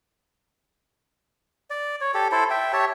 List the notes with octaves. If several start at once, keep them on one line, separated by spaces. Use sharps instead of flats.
D5
C#5
G4 A4
E4 A4 C5
E5 G5
G4 C#5 E5 A5